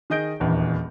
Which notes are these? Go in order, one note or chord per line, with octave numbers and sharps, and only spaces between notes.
D#3 G#4 D#5 G6 D7
D#1 A#1 E2